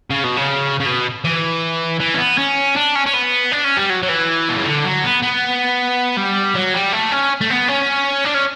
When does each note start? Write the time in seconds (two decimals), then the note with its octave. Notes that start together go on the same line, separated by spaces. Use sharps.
0.10 C#3
0.24 B2
0.37 C#3
0.80 C#3
0.86 B2
1.24 E3
2.00 E3
2.14 C#4
2.18 B3
2.38 C#4
2.76 D4
2.95 C#4
3.06 C#4
3.14 B3
3.52 D4
3.64 C#4
3.77 G3
3.90 F#3
4.03 F#3
4.09 E3
4.49 B2
4.57 C#3
4.65 D3
4.85 F#3
5.03 B3
5.22 B3
6.17 G3
6.55 F#3
6.74 G3
6.93 A3
7.12 C#4
7.41 A3
7.50 B3
7.68 C#4
8.25 D4
8.35 C#4